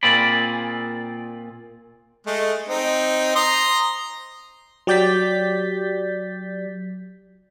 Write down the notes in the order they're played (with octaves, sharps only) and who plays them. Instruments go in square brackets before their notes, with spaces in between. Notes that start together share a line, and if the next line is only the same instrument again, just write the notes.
[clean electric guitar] A#2 C4 F4 G#4 D5 B5
[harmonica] G#3 A3
C4 D#4
A#5 C6 D#6
[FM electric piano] F#3 G4 D5 G6 A6 B6